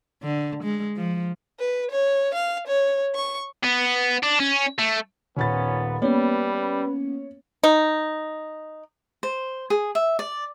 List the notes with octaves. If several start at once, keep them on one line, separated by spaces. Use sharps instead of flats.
D3
G#3
F3
B4
C#5
F5
C#5
C#6
B3
D4
C#4
A3
D#1 A#2 B3 C#4 B5 A6
G3 A#3 B3 C#4 B4 C#5
D#4
C5
G#4
E5
D5